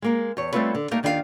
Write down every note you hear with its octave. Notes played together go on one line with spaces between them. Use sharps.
G#3 A#3 A#4
E2 C#5
G3 A3 C4 F4 B4 C#5
D3
G3 A3 A#3 D#4
D#2 D#3 D4 F4 A4 F5